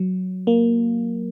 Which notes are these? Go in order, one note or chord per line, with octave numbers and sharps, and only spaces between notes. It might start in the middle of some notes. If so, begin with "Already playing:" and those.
Already playing: F#3
A#3